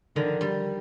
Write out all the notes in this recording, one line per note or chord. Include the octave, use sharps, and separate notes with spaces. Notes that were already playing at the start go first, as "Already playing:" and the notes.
D3 D#3 F3
G3